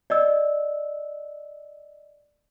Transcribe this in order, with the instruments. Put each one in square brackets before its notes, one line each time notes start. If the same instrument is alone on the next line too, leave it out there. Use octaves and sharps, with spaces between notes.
[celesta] D5 D#5 E6